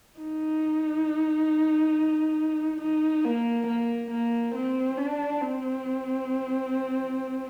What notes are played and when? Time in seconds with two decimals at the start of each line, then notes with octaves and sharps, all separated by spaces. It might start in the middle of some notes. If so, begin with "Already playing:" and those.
0.19 D#4
2.81 D#4
3.25 A#3
3.67 A#3
4.11 A#3
4.55 C4
4.98 D4
5.42 C4